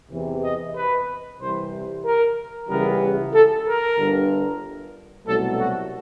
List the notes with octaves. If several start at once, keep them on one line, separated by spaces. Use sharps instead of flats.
E2 C3 E3
D#5
B4
C2 C3 E3 C5
A#4
C#2 C#3 E3 G3 B3 A#4
A4
A#4
G1 G2 D3
C2 B2 F#3 A3 A4
F#4